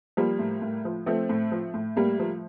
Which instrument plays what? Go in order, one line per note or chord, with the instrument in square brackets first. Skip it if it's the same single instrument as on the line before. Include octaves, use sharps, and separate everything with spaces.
[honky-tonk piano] F3 G3 A#3
A2
A2
F3
F3 A3 C4
A2
F3
A2
A2 G3 A#3
F3